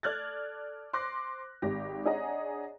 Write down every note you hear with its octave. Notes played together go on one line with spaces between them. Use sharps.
A4 D5 F6 F#6 G#6 A6
C5 C6 D6 F#6 A#6
G#1 G#2 G4 A#6
D4 G#4 C#5 D#5 F#5 A#5